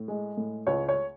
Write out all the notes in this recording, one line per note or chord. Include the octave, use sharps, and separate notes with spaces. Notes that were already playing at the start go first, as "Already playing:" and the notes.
Already playing: A2
G#3
A2
C#2 C#5
C#5